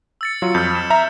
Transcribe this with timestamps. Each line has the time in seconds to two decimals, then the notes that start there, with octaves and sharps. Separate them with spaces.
0.21 E6 A6 C#7
0.42 F#3 F4
0.55 F2 F6 G6
0.75 E7
0.90 E5 A#5